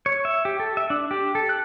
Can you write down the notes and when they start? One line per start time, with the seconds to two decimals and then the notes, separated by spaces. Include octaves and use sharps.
0.06 C#5
0.25 E5
0.45 G4
0.60 A4
0.77 E5
0.90 D4
1.11 G4
1.35 A4
1.49 F#6